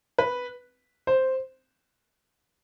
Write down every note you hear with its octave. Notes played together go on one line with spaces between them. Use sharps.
B4
C5